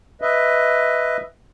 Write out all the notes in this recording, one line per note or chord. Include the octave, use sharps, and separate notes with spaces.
B4 D#5 E5